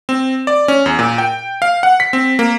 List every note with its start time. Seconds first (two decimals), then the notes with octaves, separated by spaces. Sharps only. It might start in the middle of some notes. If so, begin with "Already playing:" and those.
0.09 C4
0.47 D5
0.68 C#4
0.86 E2
0.99 A#2
1.18 G5
1.62 F5
1.83 F#5
2.00 B6
2.13 C4
2.39 A#3